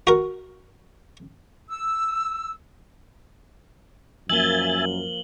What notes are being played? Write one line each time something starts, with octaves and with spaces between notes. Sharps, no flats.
F#4 A#4
E6
F#2 F3 A#3 E5 G#5 A6 F#7 G7